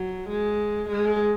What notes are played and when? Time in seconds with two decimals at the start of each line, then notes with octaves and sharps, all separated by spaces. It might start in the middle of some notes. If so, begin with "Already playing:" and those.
Already playing: F#3
0.29 G#3
0.89 G#3